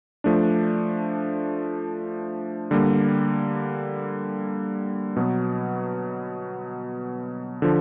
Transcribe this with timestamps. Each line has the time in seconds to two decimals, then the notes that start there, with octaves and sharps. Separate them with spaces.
0.24 F3 A3 D4
2.71 D3 G3 A#3
5.16 B2 F#3 B3
7.62 D3 F3